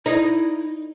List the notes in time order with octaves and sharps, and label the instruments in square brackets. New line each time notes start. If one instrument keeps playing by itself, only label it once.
[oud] D#4 [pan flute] E4